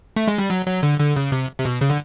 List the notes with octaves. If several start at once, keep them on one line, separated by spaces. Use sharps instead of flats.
A3
G#3
G3
F#3
F#3
D3
D3
C#3
C3
C3
B2
C#3
D3